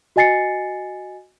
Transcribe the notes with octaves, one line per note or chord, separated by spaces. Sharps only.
F#4 D#5 G#5 A6 C7 C#7